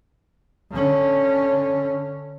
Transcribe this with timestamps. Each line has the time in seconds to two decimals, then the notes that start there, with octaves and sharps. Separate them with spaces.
0.72 D3 C#4